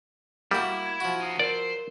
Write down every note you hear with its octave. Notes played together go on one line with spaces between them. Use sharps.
G3 A#3 E4 F#4
G#6
F3 F#4
D#4 F5
A#4 C5 D5